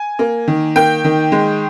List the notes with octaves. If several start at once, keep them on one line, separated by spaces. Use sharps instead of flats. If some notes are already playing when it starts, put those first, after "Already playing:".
Already playing: G#5
A#3
D#3
A#3 G5
D#3
G#3